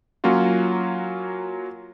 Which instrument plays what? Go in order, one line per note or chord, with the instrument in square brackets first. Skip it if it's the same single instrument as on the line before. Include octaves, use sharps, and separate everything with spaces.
[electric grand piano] F#3 A#3 C#4 F4 F#4